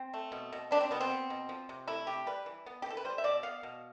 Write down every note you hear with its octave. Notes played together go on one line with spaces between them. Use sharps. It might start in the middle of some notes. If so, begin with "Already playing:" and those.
Already playing: C4
A3
B2
B2
G3 D4
C4
B2 B3
C4
B3
B2
F3
C3
A3 E4
C3 G4
G3 B4
E3
B3
G4
E3 A4
B4
G3 C5
E5
B2 D5
B3 F5
B2